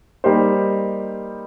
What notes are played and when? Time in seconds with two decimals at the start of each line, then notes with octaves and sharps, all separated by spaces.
0.24 G3 A#3 D#4 G4 C5